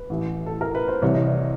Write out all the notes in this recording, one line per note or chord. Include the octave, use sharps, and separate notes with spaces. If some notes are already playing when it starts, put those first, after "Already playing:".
Already playing: B4
A1 A2 E3
A4
A#4
B4
C5
C2 C3 E3 C#5
D#5
D5